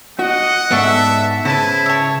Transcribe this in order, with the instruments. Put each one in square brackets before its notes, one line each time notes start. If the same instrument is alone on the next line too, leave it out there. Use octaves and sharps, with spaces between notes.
[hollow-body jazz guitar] F#4 [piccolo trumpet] D#5 [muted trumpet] F#5
[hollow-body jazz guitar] G#2 B3 [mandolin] D4 A4 C#6 [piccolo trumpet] E5
[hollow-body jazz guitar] C#3 [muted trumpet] E4 [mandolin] B4 C5 [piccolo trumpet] A5
[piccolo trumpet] C#5 [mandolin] E5 A5